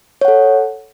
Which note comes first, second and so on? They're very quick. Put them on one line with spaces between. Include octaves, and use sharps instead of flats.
C#5 F#5 A4